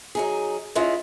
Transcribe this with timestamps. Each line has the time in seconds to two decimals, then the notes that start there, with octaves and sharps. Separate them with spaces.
0.15 F#3 D#4 G#4
0.75 G#3 C#4 E4 F4 D#5